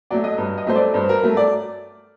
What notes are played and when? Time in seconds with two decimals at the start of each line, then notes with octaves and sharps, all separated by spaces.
0.10 F#3 A3 D5
0.24 D#5
0.38 G2
0.58 D#5
0.66 F#3 A3 C5
0.76 D5
0.94 G2 C5
1.09 A#4
1.23 F#3 A3
1.37 D5